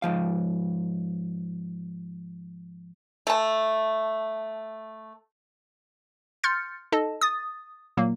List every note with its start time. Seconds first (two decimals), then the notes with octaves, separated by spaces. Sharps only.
0.02 G#2 F3 F5
3.27 A3 A5
6.44 C6 F6 G6 A6 C#7
6.92 D#4 A4 D#5 A5
7.21 D#6 A6
7.97 A#2 F#3 A#3